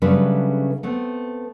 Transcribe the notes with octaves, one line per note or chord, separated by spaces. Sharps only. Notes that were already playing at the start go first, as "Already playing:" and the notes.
C#3 F#3 G3 A3 D4 B4
A3 B3 C4